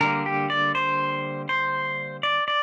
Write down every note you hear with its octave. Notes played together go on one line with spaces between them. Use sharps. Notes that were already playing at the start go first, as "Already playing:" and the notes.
D3 G3 A#3 A#4
G4
D5
C5
C5
D5
D5